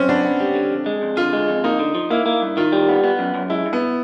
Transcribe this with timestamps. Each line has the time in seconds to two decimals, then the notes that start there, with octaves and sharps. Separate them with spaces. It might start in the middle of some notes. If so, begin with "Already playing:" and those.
Already playing: F#2 C4 C#4
0.09 B3 D4
0.24 B3
0.40 G3
0.55 D3
0.71 F2
0.86 G#3
1.02 F2
1.17 D3 F4
1.33 G#3
1.48 F2
1.64 A#3 D#4
1.79 D3
1.95 F3
2.11 A#3 E4
2.26 A#3
2.42 G2
2.57 D#3 F4
2.72 G3
2.88 B3
3.04 B3
3.19 F#2
3.35 F#2
3.50 G#3 E4
3.66 G2
3.73 B3